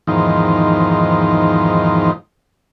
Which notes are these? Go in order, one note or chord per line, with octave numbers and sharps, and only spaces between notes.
E2 G#2 D#3 F3